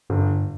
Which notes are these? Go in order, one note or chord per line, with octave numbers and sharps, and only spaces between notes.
G1 G2